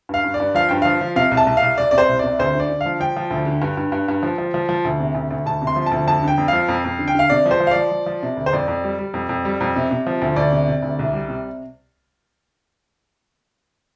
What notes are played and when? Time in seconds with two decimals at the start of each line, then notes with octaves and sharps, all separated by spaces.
0.09 G2 F5
0.24 G2
0.34 D5
0.40 G2
0.55 F3 F5
0.69 G2 G5
0.82 F3 F5
1.01 F3
1.16 C3 F5
1.31 C2
1.37 A5
1.46 C2
1.57 F5
1.62 C2
1.78 C2 D5
1.91 C3 D5
1.98 C5
2.09 C2
2.19 C3 D5
2.39 D2 C5
2.55 D3 D5
2.70 D3
2.81 F5
2.86 F3
3.00 F3 G5
3.16 F3
3.31 D2
3.46 D3
3.62 G2
3.77 G2
3.92 G2
4.08 G2
4.23 F3
4.38 F3
4.54 F3
4.69 F3
4.85 D2
5.00 C3
5.15 D2
5.31 D2
5.46 D2 A5
5.62 C3
5.67 C6
5.76 F3
5.86 A5
5.92 D2
6.07 F2 A5
6.23 D3 G5
6.38 F2
6.48 F3 F5
6.68 F2
6.84 F2
6.99 D3
7.08 G5
7.15 D3 F5
7.30 C3 D5
7.46 F3
7.51 C5
7.60 F3
7.67 F5
7.71 F3 D5
7.91 F3
8.06 F3
8.23 C3
8.37 D2
8.46 C5
8.53 F2 D5
8.68 F2
8.84 G3
8.99 G3
9.14 F2
9.29 F2
9.45 G3
9.60 F2
9.76 C3
9.91 C3
10.07 F3
10.22 D2
10.36 D2 D5
10.52 C3
10.67 C3
10.83 D2
10.99 C2
11.13 G3
11.28 C3